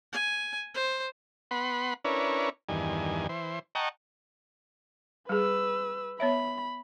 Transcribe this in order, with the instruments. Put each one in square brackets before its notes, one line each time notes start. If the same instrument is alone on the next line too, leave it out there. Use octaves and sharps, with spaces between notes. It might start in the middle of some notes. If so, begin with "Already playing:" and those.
[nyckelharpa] G#5
C5
[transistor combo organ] B3 F#5 B5 C6
C#4 D4 E4 A#4 B4 C#5
E2 G2 D#3 G#5
E3 C5
D#5 F#5 G5 A5 A#5 C#6
[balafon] G3 G#4 [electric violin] B4 E6
[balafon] B3 C#5 E5 [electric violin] B5